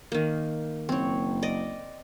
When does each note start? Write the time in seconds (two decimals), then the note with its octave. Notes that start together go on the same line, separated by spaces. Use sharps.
0.12 D#3 A#3
0.89 F#1 C4 C#5
1.43 D5 D#5